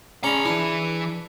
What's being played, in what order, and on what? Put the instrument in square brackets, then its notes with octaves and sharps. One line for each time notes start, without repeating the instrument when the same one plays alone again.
[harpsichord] C#4 D5 [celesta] G#4 C#7 F7 [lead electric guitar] A#5 B5
[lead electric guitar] E3 E4 [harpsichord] D4